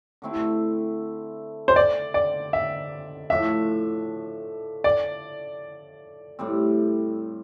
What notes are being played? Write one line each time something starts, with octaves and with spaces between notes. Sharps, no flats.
D3 A3 C4 E4
C5
D5
D5
E5
A2 F3 A3 D4 E5
D5
A2 G3 C4